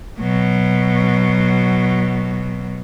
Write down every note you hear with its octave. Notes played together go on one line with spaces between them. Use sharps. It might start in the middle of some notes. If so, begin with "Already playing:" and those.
B2 F#3